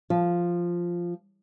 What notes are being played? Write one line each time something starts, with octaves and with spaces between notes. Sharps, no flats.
F3